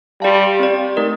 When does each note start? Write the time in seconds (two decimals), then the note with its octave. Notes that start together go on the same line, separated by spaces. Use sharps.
0.21 G3 G4 D5 F5 A5
0.59 C4 G4 D5
0.96 A3 D#4 A#4 D#5